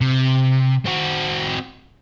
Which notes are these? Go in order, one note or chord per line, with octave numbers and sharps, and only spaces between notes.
C3
C4 F#4